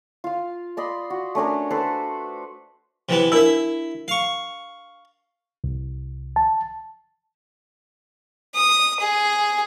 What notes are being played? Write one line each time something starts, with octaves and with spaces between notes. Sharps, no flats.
F4 F5
D5 D#5 B5 C6
F#4
A3 C#4 D4 A#4
A4 B4 C5
C3 E3 B3
D4 E4 A#4 E5 E6
F5 C#6
C2
A5
D#6
G#4